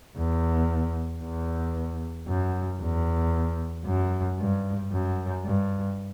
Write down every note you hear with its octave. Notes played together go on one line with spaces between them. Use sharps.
E2
E2
F#2
E2
F#2
G2
F#2
G2